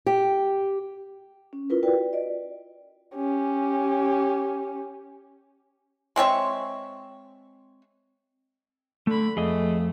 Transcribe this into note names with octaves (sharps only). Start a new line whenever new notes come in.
G4
C#4
E4 F4 A#4 B4
F#4 B4 D5 G5
D5 D#5
C#4 G4
G#3 C4 C#5 E5
D3 A3 B5
F2 A3 G#4 D#5